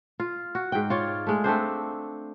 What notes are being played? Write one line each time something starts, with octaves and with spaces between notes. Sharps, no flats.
F4
F#4
G#2 G5
F4 C#5 D5
G#3 A3
A3 C4 D4 C5